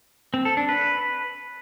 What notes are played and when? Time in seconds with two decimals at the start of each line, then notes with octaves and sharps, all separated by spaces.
0.34 C4
0.45 A4
0.57 D4
0.69 B4